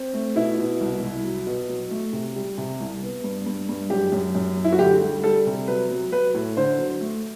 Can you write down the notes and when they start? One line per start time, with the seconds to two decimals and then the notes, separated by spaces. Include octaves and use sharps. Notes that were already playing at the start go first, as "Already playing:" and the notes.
Already playing: C4
0.14 A3
0.36 B2 E4
0.58 B2
0.81 C2
1.02 C2
1.24 F#3
1.47 B2
1.69 F#3
1.91 A3
2.13 C3
2.36 G3
2.58 C3
2.80 C2
3.02 B3
3.24 G2
3.46 G2
3.69 G2
3.90 F#2 G4
4.12 F#2
4.35 F#2
4.57 F#3
4.64 E4
4.72 F#4
4.79 D2 G4
5.01 G3
5.24 G3 A4
5.46 C3
5.68 F#3 B4
5.90 F#3
6.12 F#3 B4
6.34 A2
6.57 D3 C5
6.79 F#3
7.01 A3